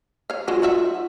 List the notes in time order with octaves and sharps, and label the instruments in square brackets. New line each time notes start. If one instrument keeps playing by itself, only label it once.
[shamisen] C#5 F5
[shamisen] F#3 G#3 D4 [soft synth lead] F4
[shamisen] D#4 F#4 E5